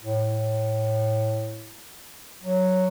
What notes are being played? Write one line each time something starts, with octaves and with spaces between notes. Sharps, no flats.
A2
F#3